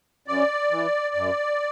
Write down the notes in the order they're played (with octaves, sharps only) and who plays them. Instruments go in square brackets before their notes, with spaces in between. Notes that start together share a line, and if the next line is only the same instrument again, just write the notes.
[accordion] F#2 D5
E3
F#2